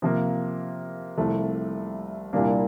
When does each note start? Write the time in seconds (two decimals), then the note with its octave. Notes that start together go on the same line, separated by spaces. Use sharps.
0.02 C3 F3 A#3
1.17 C2 C3 F3 A3
2.33 C2 A#2 G3 A#3 D4